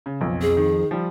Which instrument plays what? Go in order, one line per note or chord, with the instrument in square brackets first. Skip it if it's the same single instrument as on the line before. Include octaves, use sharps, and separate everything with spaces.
[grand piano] C#3
[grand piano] B1 [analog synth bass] F2
[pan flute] G#4
[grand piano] D#3
F3 G3